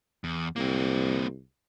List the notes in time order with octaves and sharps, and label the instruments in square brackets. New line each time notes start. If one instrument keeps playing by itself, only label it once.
[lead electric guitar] E2
[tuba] C2 [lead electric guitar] A#3 C4